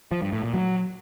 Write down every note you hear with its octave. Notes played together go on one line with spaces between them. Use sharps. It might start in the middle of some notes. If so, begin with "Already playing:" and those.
F3
G2
A2
A#2
F#3